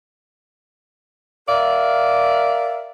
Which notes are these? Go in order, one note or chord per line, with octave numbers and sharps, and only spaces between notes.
A#4 D5 E5 F5